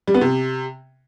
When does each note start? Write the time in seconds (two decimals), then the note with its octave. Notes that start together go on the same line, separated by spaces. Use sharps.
0.07 G3
0.14 B3
0.21 C3